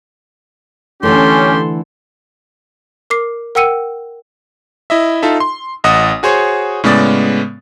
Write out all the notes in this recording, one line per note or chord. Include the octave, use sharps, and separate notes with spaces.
D3 E3 A3 C#4 G4 A4 C6
A#4 D6 C7
A#4 F#5 G5 E6 C#7 D#7
E4 D#5 E5
D#4 F4 A4 E5
C6
A1 D#5 F#5 D#6
F#4 G#4 C5 C#5
A2 C#3 G#3 B3 D5 A6